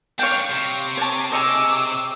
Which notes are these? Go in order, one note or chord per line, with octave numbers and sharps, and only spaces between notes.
D4 D#4 C#5 F5 G5
C3
C#5 A5
G#4 C#5 D#5 D6 E6